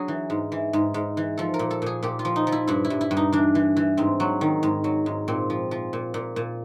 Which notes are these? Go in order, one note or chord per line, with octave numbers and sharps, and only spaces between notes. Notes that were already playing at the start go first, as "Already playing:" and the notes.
Already playing: F#3 D4 G#4
E3
G#2
E3
G#2
G#2
E3
F3 A4
A#4
A#2
A4
A#2 G#4
A#2 G4
F4
F3
D#4
F3
E4
G2 E4
E4
G2
E4
G2
D#4
E3 D4
E3
E3
G#2 C4
F#3
D#3
G#2
F#3
G#2
A#2 C4
F3
F3
A#2
A#2
A#2